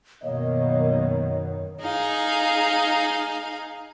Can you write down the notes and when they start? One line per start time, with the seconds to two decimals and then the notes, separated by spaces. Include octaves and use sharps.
0.23 F#2 B2 D#3 A#3 C#5 D#5
1.82 D#4 G#4 F5